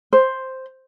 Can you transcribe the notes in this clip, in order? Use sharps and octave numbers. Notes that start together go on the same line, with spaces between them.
C5